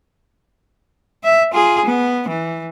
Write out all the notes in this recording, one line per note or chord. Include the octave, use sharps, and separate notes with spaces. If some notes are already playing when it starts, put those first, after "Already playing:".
E5
F4 G#4
B3
E3